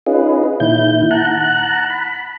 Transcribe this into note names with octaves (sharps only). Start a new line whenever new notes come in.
C#4 D#4 F4 G#4 B4
A#2 D#3 E4 G6
F#5 A5 A#5 F#6
B5